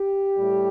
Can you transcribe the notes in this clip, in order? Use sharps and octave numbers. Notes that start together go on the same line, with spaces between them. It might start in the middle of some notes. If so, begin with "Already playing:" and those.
Already playing: G4
A2 G3